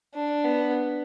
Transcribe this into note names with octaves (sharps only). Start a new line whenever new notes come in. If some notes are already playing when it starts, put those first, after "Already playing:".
D4
B3